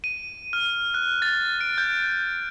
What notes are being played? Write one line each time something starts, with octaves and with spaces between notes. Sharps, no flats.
D#7
F6
F#6
A6
D7
G6